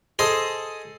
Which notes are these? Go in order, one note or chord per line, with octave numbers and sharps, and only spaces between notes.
G#4 A4 C5 D#5